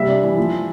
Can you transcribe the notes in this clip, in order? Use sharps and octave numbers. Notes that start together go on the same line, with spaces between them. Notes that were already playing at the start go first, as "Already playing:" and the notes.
Already playing: C3 G3 E5
D4
E3
F3